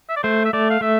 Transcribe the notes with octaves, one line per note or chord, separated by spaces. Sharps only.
E5
D5
A3 C5
E5
A3 D5
F5
A3 E5